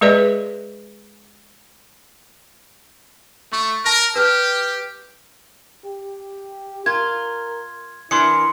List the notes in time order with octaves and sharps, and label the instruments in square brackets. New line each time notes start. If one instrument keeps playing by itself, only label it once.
[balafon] G#3 G#4 B4 D5 D#5
[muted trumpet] A3 [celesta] C#6
[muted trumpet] A#4 [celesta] A5 A#6
[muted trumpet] G4 [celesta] B4 F6
[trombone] G4
[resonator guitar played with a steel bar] F4 [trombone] A#4 [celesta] G#6
[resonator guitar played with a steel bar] E3 D4 A#4 [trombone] E4 [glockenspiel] C6 D#6 C#7